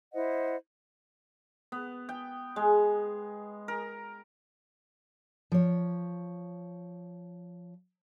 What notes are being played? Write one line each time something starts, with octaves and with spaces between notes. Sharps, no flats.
E4 C5 D#5 F#5
B3
G5
G#3
A#4
F3 C#5